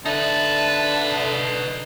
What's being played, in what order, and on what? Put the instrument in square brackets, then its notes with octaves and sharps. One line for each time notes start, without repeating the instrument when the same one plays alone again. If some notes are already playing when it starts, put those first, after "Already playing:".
[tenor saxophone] D3 [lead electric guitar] D#4 B4 [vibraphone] E5 [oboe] A5